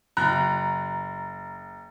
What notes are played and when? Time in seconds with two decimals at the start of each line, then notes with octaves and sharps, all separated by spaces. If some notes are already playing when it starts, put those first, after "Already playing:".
0.17 F#1 A#5 F#6